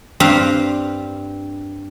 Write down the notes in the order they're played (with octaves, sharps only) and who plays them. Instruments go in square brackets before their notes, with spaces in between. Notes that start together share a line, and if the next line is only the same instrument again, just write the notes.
[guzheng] G2 C4 F5 A#5